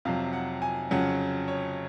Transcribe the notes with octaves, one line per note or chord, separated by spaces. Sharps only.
F2 C3 F#3 F5
F#5
G#5
F2 C#3 F#3 C#4 F#5
C#5